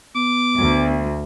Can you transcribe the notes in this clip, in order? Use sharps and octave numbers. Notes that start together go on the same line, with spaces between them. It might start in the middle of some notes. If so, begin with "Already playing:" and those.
B3 D6
D2